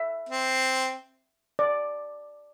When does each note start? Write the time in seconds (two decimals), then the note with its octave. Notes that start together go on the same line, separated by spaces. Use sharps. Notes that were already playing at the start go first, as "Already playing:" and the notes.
Already playing: E5
0.29 C4
1.59 D5